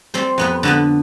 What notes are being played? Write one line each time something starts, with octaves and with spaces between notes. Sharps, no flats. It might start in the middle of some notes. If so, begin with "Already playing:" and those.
G3 C4 C5
F2 B3 B4
D3 B3 B4